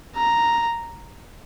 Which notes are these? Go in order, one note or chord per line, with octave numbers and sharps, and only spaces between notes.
A#5